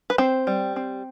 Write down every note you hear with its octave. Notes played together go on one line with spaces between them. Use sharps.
B4
C4 C5
G3
C4